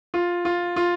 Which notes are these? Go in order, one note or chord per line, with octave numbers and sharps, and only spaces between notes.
F4
F4
F4